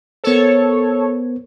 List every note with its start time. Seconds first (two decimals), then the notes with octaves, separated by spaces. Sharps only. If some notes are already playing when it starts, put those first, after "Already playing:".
0.24 B3 A4 A#4 C5 C#5